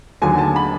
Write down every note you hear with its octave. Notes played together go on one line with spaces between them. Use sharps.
D#2 D3 F#3 G#5
A5
B5